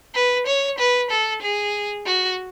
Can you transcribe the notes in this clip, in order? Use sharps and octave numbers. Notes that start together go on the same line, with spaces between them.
B4
C#5
B4
A4
G#4
F#4